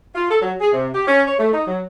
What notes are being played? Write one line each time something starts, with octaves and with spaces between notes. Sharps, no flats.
F4
A4
F#3
G#4
C3
G4
C#4
C#5
A3
D#4
F#3